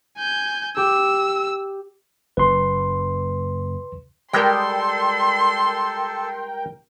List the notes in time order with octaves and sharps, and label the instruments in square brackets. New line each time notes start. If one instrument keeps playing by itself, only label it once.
[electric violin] G#5 G6
[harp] G4 [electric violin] E6
[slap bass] F#1 [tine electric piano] B4 C6
[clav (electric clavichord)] G3 G#3 [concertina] A4 [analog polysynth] A#4 G5 [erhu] C6